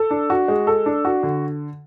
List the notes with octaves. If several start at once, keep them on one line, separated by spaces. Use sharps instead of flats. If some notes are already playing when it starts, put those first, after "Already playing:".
Already playing: A4
D4
F#4
G#3
A4
D4
F#4
D3